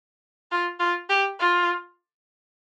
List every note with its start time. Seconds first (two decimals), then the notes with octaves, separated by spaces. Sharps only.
0.52 F4
0.80 F4
1.10 G4
1.40 F4